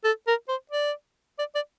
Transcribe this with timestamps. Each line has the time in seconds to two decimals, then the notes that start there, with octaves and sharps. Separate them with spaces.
0.04 A4
0.27 A#4
0.48 C5
0.71 D5
1.39 D5
1.55 D5